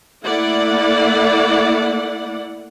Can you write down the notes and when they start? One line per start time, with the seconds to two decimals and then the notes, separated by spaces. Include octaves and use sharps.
0.23 A3 A#3 E4 D5 F#5